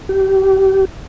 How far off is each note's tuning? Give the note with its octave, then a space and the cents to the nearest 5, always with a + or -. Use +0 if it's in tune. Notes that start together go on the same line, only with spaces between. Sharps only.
G4 -30